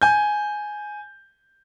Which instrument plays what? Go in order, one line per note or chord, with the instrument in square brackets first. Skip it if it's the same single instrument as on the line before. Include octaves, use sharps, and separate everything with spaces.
[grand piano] G#5 G6